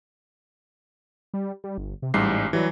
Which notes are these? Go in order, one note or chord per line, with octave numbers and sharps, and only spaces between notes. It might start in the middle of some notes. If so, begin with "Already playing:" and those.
G3
G3
G1
C3
A1 G#2 G3 C7
E3 F#3 G3